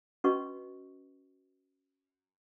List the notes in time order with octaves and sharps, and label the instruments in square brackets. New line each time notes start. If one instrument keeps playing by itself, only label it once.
[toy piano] C#4 F#4 B4 D#5 C#6